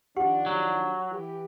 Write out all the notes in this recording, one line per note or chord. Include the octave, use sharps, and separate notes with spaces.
D#3 F3 D4 G4 F#5
F#3
E3 G4